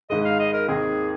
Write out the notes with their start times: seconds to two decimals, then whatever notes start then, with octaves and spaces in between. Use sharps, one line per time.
0.10 G#1 G#2 G#3 D#5
0.25 F5
0.39 D#5
0.54 A#4
0.68 D#2 D#3 C4 G#4